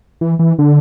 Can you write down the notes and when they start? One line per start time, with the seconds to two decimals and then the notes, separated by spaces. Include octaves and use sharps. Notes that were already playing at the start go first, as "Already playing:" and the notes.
0.21 E3
0.39 E3
0.59 D3